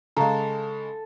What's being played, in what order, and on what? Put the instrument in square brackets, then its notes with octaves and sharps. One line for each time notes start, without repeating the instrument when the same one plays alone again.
[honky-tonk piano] C#3 G#3 [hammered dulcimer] A4 [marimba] F5 A#5